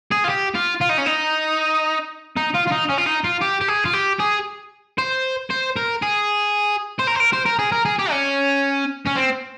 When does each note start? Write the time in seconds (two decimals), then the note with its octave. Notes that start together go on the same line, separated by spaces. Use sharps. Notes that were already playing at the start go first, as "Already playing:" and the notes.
0.11 G#4
0.24 F4
0.29 G4
0.55 F4
0.81 F4
0.89 D#4
0.98 C#4
1.06 D#4
2.37 D#4
2.55 F4
2.68 F4
2.72 D#4
2.90 C#4
2.98 F4
3.07 D#4
3.24 F4
3.41 G4
3.61 G4
3.68 G#4
3.85 F4
3.93 G4
4.20 G#4
4.98 C5
5.50 C5
5.76 A#4
6.02 G#4
6.99 C5
7.07 A#4
7.15 C5
7.20 A#4
7.33 C5
7.46 A#4
7.59 G#4
7.72 A#4
7.85 G#4
7.99 G4
8.11 C#4
9.06 C#4
9.16 C4